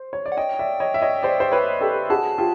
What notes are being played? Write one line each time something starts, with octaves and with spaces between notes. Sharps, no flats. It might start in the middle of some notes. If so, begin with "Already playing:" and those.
Already playing: C5
C#5
D5
F#5
C#5 D#5 G5
D5 E5
C#5 D#5
E5
C#5 D#5
C5 D5
C5
B4 C#5
G4 A4
F#4 G#4 A5
F4 G4